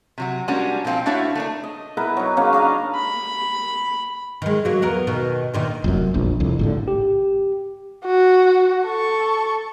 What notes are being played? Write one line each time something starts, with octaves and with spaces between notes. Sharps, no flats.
C3 F#3 F#4
G3 G#3 A#3 C#4 D4 F#4
A#2 F3 C4 F5 G5
A3 D4 E4 F#4 C#5 F5
A3 A#3 D4
D#5
B3 E4 A#4 B4
F#3 D#4
C#3 A#3 C#4
D4 A#4 D#5 F5
B5
D#3 G#3
F#3 A#3
E2 B3 A#4
B2 D#3
D2 A#2 D#3
F1 C2 F#2
E1 A#1
C2 F2
G#1 A2 D3
G4
F#4
A4 C#6